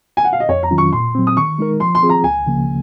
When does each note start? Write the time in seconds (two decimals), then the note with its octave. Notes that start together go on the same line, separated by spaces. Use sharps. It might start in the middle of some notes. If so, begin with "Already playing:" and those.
0.17 G#5
0.24 F#5
0.33 F5
0.40 D#5
0.49 F2 C#5
0.63 A#5
0.71 D#3 F#3 C#4 F4
0.78 C#6
0.92 A#2 C6
1.15 F#3 C4
1.27 D#6
1.37 D#3 C#6
1.59 G#3 D#4 A#4
1.80 F3 C6
1.95 C6
2.03 C4 F4 G#4
2.09 A#5
2.24 C#2 G#5
2.47 C#3 F3 A#3